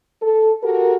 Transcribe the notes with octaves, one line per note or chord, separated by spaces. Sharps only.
A4
F#4 G4 A4 A#4